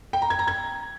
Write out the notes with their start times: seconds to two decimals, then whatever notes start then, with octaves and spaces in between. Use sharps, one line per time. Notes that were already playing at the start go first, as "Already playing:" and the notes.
0.13 G5
0.22 A#5
0.30 G#6
0.39 A#5
0.47 G#6